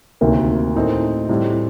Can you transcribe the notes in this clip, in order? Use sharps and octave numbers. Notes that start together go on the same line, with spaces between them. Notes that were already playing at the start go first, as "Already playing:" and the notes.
D2 C3 D#3 A#3
A2 A3 C4 D#4
A2 G3 C4